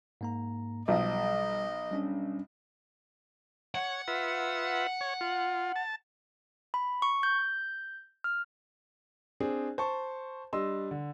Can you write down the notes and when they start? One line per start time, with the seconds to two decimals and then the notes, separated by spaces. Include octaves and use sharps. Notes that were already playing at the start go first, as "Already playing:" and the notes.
0.21 G#2 A#3 A#5
0.88 B1 F3 G3 D#5
1.91 G3 C#4 D4
3.75 C#5 F#5
4.08 F4 B4 E5
5.01 C#5
5.21 F4
5.76 A5
6.74 B5
7.02 C#6
7.23 G6
8.24 F6
9.40 C4 D4 G#4
9.78 C5 A5 C#6
10.53 G3 D4 D#5 C6 E6
10.91 D3